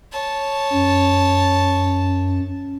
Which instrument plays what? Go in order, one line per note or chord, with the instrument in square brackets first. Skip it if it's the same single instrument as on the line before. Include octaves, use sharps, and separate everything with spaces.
[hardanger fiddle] C#5 A5
[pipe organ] F#2